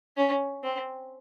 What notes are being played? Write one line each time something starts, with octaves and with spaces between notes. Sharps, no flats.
C#4
C4